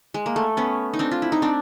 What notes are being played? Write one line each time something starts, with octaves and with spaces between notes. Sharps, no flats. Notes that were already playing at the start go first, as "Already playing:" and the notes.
G#3
A#3
A3
B3 C#4
D#4
C4 D4
F4
E4
D#4
C4 D4